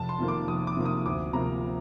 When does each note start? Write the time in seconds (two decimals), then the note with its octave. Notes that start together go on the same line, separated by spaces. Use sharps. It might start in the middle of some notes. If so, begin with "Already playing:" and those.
Already playing: F1 A5
0.09 C6
0.18 F2 C3 D#3 A#3
0.28 D6
0.48 F1 D#6
0.67 D6
0.77 F2 C3 D#3 A#3
0.86 D#6
1.06 D2 D6
1.33 C3 F3 A#3 A#5